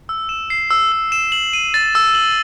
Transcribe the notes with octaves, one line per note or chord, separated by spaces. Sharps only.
E6
E7
C7
E6
E6
E7
F#7
D#7
A6
E6
F#7